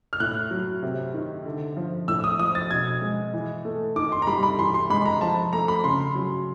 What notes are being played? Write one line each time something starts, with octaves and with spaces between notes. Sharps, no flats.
F6
A2 F#6
F#3
C3
D#3
D3
F3
A2 E6
D#6
F3 D#6
A6
B2 G#6
G#3
E3
A3
D#3 D6
C6
A#5
G3 B5
B5
E3 C6
C6
G#3 B5
A#5
F3 A5
A3 A#5
B5
C#3 C6
F#3